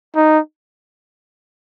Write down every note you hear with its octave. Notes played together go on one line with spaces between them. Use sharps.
D#4